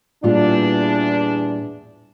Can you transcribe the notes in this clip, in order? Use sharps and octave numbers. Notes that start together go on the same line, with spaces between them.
E2 A#2 G3 D4 F4